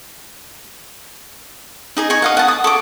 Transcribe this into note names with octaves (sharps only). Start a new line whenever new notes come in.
D#4 G#4 D#5
D#4 G#5 C#6
D#5 F5 F#5
F#5 A5
D#6
A4 C#6 D6